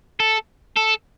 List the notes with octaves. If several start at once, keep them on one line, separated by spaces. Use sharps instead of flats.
A4
A4